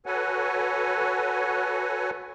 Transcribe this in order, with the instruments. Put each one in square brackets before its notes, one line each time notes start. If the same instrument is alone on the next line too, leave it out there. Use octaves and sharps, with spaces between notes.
[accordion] F#4 A4 B4 C#5 F#5 G#5